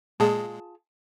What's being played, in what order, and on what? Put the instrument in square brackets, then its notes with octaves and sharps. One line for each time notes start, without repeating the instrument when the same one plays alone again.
[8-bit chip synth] A#2 G#3 [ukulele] F4 G#4 A5